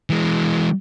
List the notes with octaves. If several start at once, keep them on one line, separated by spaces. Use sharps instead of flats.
E3 G#3